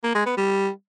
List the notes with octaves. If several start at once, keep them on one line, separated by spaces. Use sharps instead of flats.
A#3
G#3
B3
G3